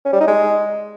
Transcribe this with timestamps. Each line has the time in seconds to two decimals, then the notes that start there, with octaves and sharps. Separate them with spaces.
0.06 C#4
0.13 G3
0.20 D#4
0.28 G#3